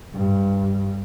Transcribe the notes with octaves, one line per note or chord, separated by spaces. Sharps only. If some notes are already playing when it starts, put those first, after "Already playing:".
G2